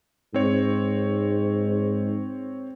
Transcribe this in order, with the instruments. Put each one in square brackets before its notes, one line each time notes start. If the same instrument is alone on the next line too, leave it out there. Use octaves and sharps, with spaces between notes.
[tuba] G#2 [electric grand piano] C4 C#5